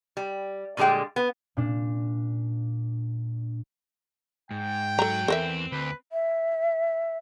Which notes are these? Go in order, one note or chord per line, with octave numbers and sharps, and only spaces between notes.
G3
A#2 D3 G3 G#3 G5
B3
A#2 D4
G#2 G5
F#3 A4 A#5
E2 C4 A4 A#4 E5
D2 B4
E5